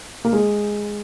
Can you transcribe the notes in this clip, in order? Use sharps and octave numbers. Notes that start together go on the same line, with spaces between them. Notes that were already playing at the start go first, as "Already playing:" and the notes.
A#3
G#3